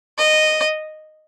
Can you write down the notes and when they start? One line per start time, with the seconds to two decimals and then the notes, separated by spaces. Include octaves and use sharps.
0.18 D#5